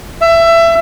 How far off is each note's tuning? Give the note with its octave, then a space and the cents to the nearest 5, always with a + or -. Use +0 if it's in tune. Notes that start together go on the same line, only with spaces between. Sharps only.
E5 +20